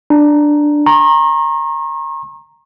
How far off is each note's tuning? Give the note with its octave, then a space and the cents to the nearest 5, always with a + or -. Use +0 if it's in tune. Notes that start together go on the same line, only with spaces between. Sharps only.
D4 +5 A#5 +0
A#5 +0 C#6 -40